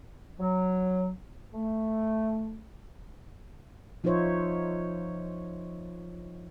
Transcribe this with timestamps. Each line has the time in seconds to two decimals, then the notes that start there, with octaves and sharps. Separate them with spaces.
0.40 F#3
1.54 A3
4.04 F3 D#4 F4 C5 C#5 E5